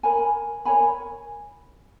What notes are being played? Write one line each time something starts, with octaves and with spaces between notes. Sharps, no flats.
A#4 C#5 G#5 B5
A#4 C#5 G#5 B5